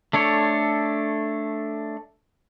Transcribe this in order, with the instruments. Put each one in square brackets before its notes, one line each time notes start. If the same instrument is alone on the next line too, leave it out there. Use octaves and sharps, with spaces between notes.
[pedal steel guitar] A3 D4 A4 C#5